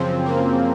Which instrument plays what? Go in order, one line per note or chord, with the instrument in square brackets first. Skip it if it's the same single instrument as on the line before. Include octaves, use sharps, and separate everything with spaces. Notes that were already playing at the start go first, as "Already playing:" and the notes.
Already playing: [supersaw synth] F#2 C#3 F3 C4
A#3